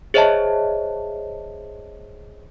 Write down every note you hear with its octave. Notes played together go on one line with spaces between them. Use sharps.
G#4 C5 C#5 D#5 E5 A5